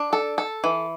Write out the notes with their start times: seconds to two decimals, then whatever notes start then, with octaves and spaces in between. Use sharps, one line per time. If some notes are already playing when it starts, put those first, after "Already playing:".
Already playing: D4
0.13 A4
0.38 A4
0.64 E3